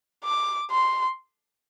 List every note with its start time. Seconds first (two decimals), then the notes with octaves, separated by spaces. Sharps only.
0.24 D6
0.71 C6